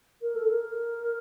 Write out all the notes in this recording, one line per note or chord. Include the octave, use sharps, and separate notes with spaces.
A#4
A4
A#4